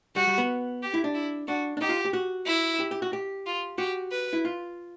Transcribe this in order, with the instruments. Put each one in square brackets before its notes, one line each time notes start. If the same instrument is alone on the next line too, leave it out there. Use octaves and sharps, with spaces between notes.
[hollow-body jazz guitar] G3 [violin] F#4
[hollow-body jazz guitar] G3
B3
[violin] G4
[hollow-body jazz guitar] E4
D4
[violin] E4
[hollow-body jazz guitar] D4 [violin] F#4
[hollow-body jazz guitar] D4
[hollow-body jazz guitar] D#4 [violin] G4
[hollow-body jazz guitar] F4
G4
F#4
[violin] E4
[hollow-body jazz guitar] G4
G4
F#4
G4
[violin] F4
[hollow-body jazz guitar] F#4 [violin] G4
[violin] B4
[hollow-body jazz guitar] E4
F4